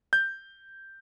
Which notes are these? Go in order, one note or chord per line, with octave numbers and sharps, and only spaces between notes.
G6